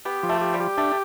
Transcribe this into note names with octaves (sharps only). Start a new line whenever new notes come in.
B3 G4
F3
A3
G4
G3
G4
A3 D4